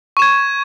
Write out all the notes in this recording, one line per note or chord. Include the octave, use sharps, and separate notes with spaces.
C#6 G#6 E7